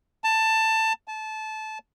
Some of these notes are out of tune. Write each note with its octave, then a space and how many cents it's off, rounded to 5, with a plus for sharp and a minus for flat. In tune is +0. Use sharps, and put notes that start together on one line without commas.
A5 +15
A5 -20